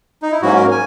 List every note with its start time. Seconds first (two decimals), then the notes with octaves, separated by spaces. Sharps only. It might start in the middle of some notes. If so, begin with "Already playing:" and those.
0.22 D#4
0.32 E4
0.42 G#2 F#3 A#3 C#4 F#4
0.56 A#4
0.71 G#5